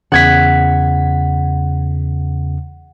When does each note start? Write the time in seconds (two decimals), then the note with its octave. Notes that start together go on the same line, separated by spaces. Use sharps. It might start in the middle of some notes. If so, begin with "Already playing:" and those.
0.12 E2 C#3 F#5 G#6 B6